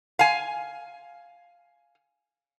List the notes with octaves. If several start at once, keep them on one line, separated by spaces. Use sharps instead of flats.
F5 G#5